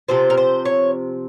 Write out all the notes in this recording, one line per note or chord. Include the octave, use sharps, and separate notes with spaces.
C3 F3 C4 C5
A#4
C5
C#5